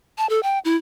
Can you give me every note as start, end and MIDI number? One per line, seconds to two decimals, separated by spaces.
0.18 0.29 81
0.29 0.40 69
0.43 0.59 79
0.65 0.76 64